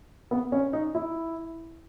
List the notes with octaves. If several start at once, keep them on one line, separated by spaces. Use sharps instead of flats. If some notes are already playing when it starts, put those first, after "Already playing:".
B3
C#4
D#4
E4